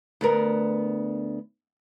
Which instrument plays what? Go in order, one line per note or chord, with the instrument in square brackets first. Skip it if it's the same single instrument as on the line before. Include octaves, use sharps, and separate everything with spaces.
[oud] D2 B3 A#4